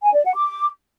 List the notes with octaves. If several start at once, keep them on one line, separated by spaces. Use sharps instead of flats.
G#5
D5
F#5
D6